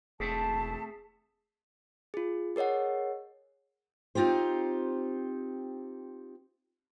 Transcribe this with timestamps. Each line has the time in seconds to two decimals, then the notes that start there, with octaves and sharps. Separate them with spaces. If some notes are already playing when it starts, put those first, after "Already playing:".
0.20 E1 A3 C4 G#4 A5 B6 C7
2.14 F4 G#4
2.56 G#4 A#4 C#5 D#5 F#5
4.15 C4 D#4 F4 G4 C5